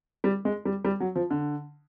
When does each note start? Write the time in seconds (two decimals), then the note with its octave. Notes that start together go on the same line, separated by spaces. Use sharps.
0.24 G3
0.45 G#3
0.65 G3
0.85 G3
1.00 F#3
1.16 F3
1.31 D3